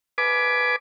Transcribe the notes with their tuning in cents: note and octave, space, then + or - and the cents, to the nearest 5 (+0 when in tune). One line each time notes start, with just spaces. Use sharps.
B4 +0 G#5 +25 D6 +0